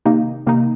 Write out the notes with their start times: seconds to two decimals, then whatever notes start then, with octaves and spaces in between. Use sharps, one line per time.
0.06 C3 D#3 A#3 D#4
0.47 C3 D#3 A#3 D#4